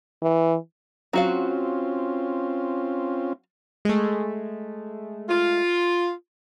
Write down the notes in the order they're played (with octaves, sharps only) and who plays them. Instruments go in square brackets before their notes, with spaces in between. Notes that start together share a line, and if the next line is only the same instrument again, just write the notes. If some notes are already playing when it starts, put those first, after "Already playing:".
[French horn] E3
[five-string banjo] F#3 F#4 F5 [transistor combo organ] C4 C#4 F4
[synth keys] G#3 A3
[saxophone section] F4